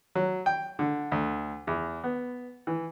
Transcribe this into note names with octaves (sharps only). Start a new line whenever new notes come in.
F#3
G5
D3
D2
E2
B3
E3